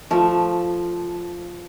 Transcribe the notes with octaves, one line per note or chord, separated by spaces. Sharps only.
F3 A3